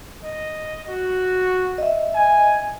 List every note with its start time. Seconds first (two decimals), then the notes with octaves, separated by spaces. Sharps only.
0.24 D#5
0.89 F#4
1.78 D#5 E5
2.15 G#5